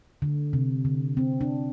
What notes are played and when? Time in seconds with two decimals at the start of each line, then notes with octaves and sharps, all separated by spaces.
0.22 D3
0.53 C3
0.85 D3
1.17 C4
1.41 D4